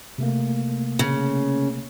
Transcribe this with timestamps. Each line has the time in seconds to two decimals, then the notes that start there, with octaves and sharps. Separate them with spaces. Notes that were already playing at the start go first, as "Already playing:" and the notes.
0.18 C3 A3 A#3
0.99 C#3